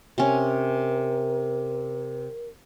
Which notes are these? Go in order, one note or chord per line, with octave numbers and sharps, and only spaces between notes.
C3 C#4 A#4